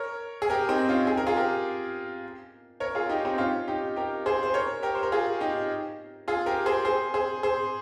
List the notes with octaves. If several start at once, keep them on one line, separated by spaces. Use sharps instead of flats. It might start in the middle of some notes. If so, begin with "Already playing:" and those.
Already playing: A#4 C#5
G#4
G4 A#4
C4 D#4
C#4 F4
G#4
A#4
F4 G#4
G4 A#4
A#4 C#5
F4 G#4
D#4 G4
C4 D#4
C#4 F4
D#4 G4
G4 A#4
G#4 C5
C5
A#4 C#5
G4 A#4
C5
A#4
F4 G#4
D#4 G4
F4 G#4
G4 A#4
G#4 C5
G#4 C5
G#4 C5
G#4 C5